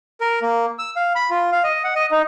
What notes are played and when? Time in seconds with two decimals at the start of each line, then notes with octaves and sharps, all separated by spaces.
0.21 A#4
0.42 A#3
0.79 E6
0.96 F5
1.16 B5
1.30 F4
1.52 F5
1.64 D#5
1.84 F#5
1.96 D#5
2.11 D#4